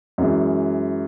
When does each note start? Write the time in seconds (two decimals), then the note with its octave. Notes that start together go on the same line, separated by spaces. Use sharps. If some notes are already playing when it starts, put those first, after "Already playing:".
0.18 F#2 E3 G#3